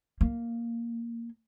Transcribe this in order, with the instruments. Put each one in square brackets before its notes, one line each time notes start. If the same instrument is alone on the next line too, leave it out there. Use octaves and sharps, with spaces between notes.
[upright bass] A#3